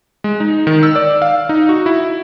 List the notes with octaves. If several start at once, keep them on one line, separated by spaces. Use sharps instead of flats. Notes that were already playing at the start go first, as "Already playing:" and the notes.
G#3
D#4
D#3
E6
D5
F5
D#4
F#4
E4